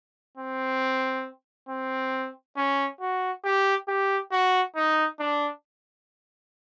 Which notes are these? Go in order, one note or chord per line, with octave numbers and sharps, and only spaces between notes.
C4
C4
C#4
F#4
G4
G4
F#4
D#4
D4